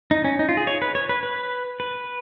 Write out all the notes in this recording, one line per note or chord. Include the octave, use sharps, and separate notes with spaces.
D#4
C#4
D#4
F4
G#4
C#5
B4
C#5
B4
B4
B4